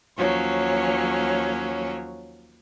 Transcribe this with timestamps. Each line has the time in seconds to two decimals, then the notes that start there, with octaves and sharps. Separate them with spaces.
0.17 D#2 F3 F#3 C#4 C#5